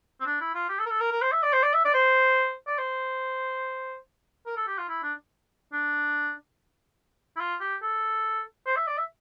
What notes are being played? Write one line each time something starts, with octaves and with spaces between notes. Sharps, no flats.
C4
D4
E4
F4
G4
A4
A#4
A4
A#4
A#4
C5
E5
D5
C5
D5
E5
D5
C5
D5
C5
A#4
A4
G4
F4
E4
D4
D4
E4
F4
G4
A4
C5
E5
D5
E5